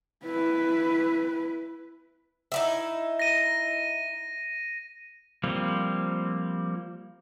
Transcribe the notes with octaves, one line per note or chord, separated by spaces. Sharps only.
E4 B4
D#4 E4 E5
A#6 D#7
F3 G3 A#3 C4